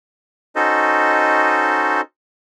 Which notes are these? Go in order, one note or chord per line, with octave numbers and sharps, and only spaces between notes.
C#4 D#4 F#4 A4 C5 D#5